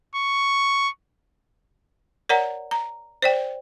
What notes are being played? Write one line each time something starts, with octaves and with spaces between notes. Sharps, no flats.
C#6
A#4 C#5 D5 F#5 A#5
A#5
C5 D5 G5